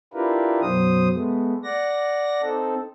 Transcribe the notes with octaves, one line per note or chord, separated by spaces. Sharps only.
D4 E4 F4 G4 A#4 B4
F#2 B2 F#3 C5 D#6
G#3 A3 B3
D5 F#5 A#6
C4 D#4 A4